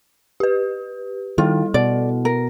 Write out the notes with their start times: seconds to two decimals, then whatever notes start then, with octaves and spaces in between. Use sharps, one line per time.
0.40 G4 B4
1.38 D#3 G3 E4 F4 A4
1.74 B2 D5
2.25 A#4